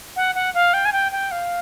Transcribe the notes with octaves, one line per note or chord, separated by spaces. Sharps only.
F#5
F#5
F5
G5
G#5
G5
G5
F5